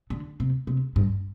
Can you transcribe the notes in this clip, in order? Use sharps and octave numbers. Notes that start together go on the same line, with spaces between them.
D3
C3
C3
G2